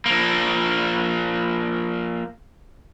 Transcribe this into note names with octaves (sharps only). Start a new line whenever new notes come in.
F3 A#3